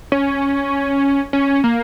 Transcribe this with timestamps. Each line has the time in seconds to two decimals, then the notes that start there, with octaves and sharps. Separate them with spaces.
0.12 C#4
1.33 C#4
1.64 A#3